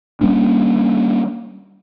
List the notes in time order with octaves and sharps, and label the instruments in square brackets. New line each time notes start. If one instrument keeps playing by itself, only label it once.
[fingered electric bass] G3 A#3 C#4 D4